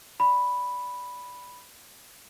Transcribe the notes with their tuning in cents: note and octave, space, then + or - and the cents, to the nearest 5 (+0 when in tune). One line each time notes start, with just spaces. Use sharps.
D5 +0 B5 +0